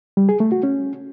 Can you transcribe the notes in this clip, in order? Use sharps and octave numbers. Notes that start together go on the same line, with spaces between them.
G3
G#4
A3
F#4
C#4